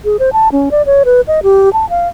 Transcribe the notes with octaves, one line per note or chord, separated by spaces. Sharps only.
G#4
C5
A5
C#4
D5
C#5
B4
D#5
G4
A5
F5